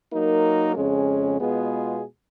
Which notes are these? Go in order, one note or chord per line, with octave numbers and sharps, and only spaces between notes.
F#3 A#3 D#4 A#4
F2 C#3 G#3 C#4
B2 G#3 B3 F4 G#4